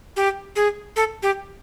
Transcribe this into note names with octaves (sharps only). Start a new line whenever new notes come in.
G4
G#4
A4
G4